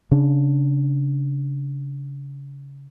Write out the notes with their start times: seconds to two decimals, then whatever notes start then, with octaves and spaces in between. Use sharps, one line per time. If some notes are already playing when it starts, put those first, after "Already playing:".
0.11 C#3 D4